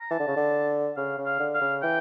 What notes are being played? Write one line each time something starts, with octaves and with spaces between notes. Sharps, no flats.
A#5
E3 A5
D3
C#3
D3
C#3 F5
C#3
F5
D3
F5
C#3
E3 G5